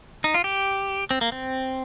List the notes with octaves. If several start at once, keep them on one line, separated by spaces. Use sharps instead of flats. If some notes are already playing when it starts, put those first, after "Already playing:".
D#4
F4
G4
C4
A#3
C4